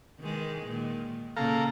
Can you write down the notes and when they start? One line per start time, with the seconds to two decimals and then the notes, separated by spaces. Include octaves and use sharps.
0.20 D#3 E3 G#3
0.68 A#2 D#3
1.37 A#2 C#3 A#3 A4 F5 A#5